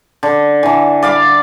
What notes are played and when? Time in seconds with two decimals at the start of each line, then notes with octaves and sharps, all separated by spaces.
0.23 D3
0.63 D3 E3
1.03 D5 F5 B5